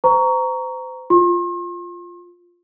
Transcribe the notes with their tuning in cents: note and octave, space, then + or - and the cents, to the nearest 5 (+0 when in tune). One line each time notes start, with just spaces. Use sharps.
C5 -35 A#5 -5 C#6 +25
F4 +0 C6 +40